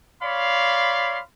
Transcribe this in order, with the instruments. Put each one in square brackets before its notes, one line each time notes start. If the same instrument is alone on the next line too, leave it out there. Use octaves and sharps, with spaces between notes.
[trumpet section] C#5 D5 F5 B5 C6